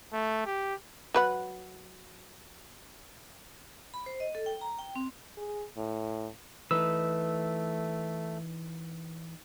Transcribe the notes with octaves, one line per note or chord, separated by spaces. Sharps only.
A3
G4
F#3 B4 F#5
B5
C5
D#5
A4
G5
A#5
G5
C4
G#4
A2
E3 A3 D#4 B4 E6